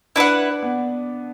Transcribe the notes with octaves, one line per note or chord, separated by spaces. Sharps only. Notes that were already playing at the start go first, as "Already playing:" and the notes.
D4 E4 B4 F#5
B3